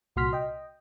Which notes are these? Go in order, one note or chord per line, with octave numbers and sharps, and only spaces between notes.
C2 A#2 F#4 C6 F6 B6
D#5 G5